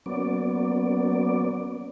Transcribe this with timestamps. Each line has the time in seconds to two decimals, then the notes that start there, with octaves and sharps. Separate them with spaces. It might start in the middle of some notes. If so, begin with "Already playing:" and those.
0.06 F#3 A#3 B3 C#4 D5